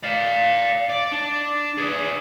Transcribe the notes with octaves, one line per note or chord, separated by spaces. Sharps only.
D5 F5
D5
D4
G#4 B4